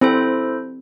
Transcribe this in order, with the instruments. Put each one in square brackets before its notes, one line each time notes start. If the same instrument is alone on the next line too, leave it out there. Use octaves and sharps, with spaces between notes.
[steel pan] C4 [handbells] E4 A4 C5